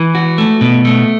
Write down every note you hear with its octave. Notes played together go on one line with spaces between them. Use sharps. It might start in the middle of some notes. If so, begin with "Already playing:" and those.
Already playing: E3
F#4
A3
B2
A3